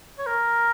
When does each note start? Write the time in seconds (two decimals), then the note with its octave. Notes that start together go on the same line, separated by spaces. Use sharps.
0.19 C#5
0.27 A#4